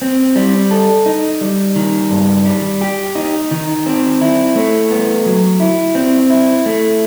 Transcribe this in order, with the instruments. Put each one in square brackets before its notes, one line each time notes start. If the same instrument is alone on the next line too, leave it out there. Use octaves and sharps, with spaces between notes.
[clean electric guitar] C4
G3
A4
D#4
G3
D#3
G2
G3
G4
D#4
D#3
C4
E4
A3
B3
F#3
E4
C4
E4
A3